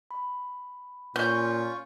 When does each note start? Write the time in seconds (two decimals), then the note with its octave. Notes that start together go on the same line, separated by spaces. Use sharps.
0.11 B5
1.16 A#2 C#4 F4 C#6 G6